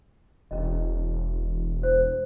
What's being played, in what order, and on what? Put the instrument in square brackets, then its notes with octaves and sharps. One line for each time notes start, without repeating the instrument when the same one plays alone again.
[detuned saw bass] E1 [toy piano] C#4 D#5
[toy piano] C5